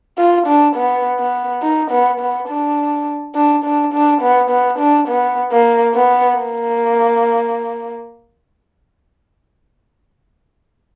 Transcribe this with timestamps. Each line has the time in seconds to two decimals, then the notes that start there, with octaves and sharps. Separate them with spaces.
0.18 F4
0.47 D4
0.76 B3
1.19 B3
1.62 D#4
1.91 B3
2.20 B3
2.48 D4
3.35 D4
3.64 D4
3.93 D4
4.21 B3
4.50 B3
4.79 D4
5.08 B3
5.52 A#3
5.95 B3
6.38 A#3